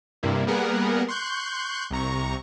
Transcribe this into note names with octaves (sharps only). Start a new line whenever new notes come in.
G2 C3 G3 A#3 E4
G3 A#3 B3 G#4 A#4 F#5
C6 C#6 F#6 G6
C2 C3 A#5 C#6